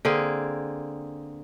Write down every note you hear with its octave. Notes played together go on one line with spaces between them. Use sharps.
D3 A#3 C4 G#4